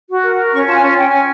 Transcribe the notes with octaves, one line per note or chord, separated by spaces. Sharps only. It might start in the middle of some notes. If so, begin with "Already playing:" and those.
F#4
A#4
A#4
C#4 C#6
F4 A5
G#5
C#4
C#4 G5
C#4 G#5